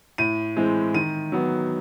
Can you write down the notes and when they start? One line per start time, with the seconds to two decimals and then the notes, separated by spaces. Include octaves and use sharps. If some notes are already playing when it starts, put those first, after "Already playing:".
0.18 A2 D#7
0.57 E3 G#3 C4
0.94 D#3 D#7
1.32 F#3 B3